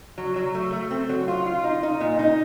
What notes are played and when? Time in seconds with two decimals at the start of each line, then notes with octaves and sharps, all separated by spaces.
0.18 F#3
0.36 F#3
0.55 A3
0.73 A3
0.91 C4
1.09 F#3
1.28 F4
1.46 F4
1.64 D#4
1.83 D#4
2.00 A#2
2.19 D#4